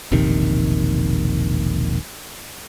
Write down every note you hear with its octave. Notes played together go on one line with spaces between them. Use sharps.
E1 A#1 C3 D#3